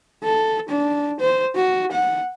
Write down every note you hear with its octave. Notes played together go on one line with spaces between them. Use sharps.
A4
D4
C5
F#4
F#5